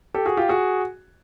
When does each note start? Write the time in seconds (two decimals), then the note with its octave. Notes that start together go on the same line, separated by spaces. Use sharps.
0.14 G4 A4
0.26 F#4 G#4
0.37 F4 G4
0.49 F#4 G#4